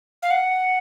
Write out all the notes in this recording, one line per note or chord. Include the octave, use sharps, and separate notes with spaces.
F5
F#5